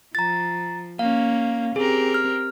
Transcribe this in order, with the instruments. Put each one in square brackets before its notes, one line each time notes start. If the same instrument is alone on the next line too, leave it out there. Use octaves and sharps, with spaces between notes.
[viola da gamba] F3 [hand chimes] A#5 A6
[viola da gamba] A#3 C#4 [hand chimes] F5
[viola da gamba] C4 G4 A#4 [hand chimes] G#4
[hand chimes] F6